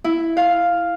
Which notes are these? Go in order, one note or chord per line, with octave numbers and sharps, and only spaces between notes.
E4
F5